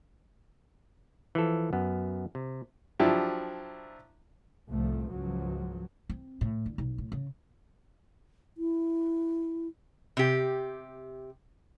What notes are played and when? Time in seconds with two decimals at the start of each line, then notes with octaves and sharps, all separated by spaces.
1.35 E3 F3 A4
1.73 F#2 B3
2.35 C3
2.99 F3 F#3 D4 E4 G4
4.69 C2 A2 F3 A3
5.11 C#2 G#2 F3 F#3
6.09 C4
6.41 A2
6.66 D3
6.78 B1
6.98 A2
7.12 C#3
8.57 E4
10.17 C3 G4